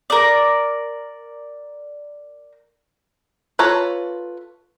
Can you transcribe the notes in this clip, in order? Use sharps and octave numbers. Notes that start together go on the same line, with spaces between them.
A#4 D5
F4 A4 B4 C#5 A#5